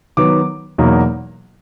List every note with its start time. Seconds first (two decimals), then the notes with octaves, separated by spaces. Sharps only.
0.17 D#3 F#3 B3 D6
0.78 E2 B2 F#3 A#3 D#4